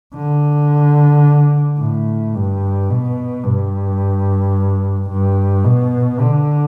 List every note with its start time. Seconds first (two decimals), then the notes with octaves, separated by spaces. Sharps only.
0.15 D3
1.79 A2
2.35 G2
2.90 B2
3.44 G2
5.10 G2
5.65 B2
6.20 D3